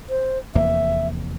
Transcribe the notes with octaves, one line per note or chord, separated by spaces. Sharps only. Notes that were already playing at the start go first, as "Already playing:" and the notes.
C5
F1 E2 A#3 E5